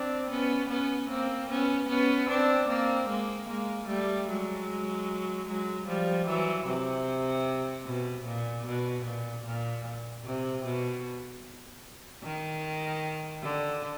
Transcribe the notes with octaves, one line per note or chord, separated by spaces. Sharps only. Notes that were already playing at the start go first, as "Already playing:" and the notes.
Already playing: C4 D4
B3 C#4
B3 C#4
A#3 C4
B3 C#4
B3 C#4
C4 D4
A#3 C4
G#3 A#3
G#3 A#3
G3 A3
F#3 G#3
F#3 G#3
F3 G3
E3 F#3
C3
B2
A#2
B2
A#2
A#2
C3
B2
D#3
D3